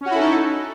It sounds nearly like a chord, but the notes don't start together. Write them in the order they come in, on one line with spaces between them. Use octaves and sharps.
C#4 F#4 E4 A4 D#4